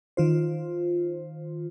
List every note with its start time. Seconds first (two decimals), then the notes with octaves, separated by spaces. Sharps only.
0.17 D#3 F4 C5